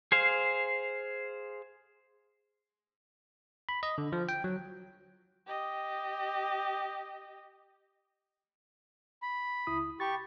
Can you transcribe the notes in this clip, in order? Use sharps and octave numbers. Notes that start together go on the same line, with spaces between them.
G#4 C5 F5
B5
D#5
D3
F3
G5
F#3
G4 D#5
B5
C#2 E4 D#6
G4 B5 C#6 A6